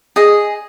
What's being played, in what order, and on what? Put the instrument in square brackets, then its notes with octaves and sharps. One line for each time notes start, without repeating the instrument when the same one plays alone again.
[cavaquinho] G#4 D#5